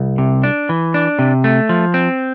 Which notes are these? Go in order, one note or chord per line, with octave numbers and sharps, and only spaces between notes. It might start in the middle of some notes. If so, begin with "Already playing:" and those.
Already playing: C2
C3
D4
E3
D4
C3
A3
F3
C4